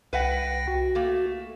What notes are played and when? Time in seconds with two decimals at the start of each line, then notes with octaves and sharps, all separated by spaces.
0.13 C2 B4 E5 F#5 G5 A#6
0.68 F#4
0.95 A3 A#3